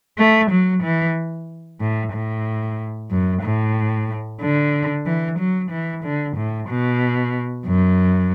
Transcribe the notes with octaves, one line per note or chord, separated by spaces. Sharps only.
A3
F#3
E3
A2
A2
F#2
A2
D3
E3
F#3
E3
D3
A2
B2
F#2